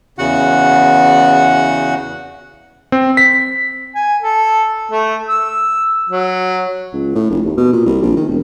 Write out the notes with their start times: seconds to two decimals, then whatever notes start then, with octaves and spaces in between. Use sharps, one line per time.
0.18 E2 C#3 F#4 F#5
2.92 C4
3.17 B6
3.95 G#5
4.22 A4
4.91 A3
5.28 E6
6.10 F#3
6.93 C#2
7.15 A2
7.30 F1
7.45 D#2
7.57 B2
7.72 A#2
7.85 C2
8.02 A#1
8.16 D#3
8.29 E1